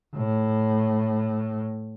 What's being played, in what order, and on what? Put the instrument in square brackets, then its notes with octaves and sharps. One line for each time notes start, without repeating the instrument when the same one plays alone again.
[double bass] A2